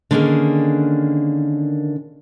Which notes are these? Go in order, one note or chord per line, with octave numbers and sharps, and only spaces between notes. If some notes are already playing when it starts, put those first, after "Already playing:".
D3 D#3 A#3 C#4 D4 G#4